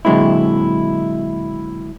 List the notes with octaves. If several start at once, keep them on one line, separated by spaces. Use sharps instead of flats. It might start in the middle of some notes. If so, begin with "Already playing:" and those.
A#2 D3 F#3 G#3 C4 E4